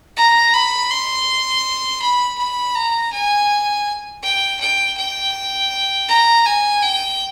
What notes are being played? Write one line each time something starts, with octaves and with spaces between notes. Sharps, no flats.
A#5
B5
C6
B5
B5
A#5
G#5
G5
G5
G5
A#5
G#5
G5